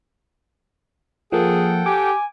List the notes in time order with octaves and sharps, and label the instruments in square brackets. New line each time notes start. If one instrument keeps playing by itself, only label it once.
[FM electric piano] F3 A#3 [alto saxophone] G#4 [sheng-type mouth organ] A4 F#5 G5
[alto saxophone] G4 [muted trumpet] G#5 [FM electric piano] D6